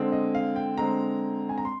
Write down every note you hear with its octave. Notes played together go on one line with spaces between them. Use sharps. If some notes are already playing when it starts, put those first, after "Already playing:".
Already playing: D3 G#3 C4
D#5
F5
G5
D3 G#3 C4 A#5
G#5
A#5
C6